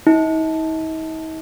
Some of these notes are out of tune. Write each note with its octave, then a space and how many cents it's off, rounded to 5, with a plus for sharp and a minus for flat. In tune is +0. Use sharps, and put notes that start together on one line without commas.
D#4 +45